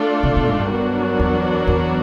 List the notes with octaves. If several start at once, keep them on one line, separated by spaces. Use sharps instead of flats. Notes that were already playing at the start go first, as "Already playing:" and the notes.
Already playing: A3 D4 F4 A4
C3
B2
G#2
G2
F#3 B3 D4 F#4 A#4
E2
E2